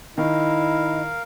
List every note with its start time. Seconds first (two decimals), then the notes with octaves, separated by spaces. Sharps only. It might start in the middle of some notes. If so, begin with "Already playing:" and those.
0.18 D#3 E4 A#4 D#5 F5